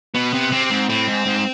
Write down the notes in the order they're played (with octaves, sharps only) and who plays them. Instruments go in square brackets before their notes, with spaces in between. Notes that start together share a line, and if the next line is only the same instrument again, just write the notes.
[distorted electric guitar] B2 [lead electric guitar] B3
[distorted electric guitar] C3
[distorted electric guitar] C3 [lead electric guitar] C4
[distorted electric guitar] G#2
[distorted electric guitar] A2 [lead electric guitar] C4
[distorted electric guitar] G#2
G#2